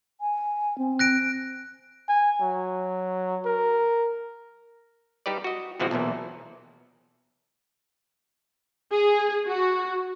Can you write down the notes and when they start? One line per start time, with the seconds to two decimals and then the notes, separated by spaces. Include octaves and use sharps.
0.21 G#5
0.78 C4
0.99 F#6 A#6 D7
2.09 G#5
2.41 F#3
3.45 A#4
5.26 G3 D#4 G4 B4 D5
5.44 F#4 D#5
5.80 B2 E3 F3 G#3 C4 F#4
5.91 B1 E2 A#2 E3
8.92 G#4
9.47 F#4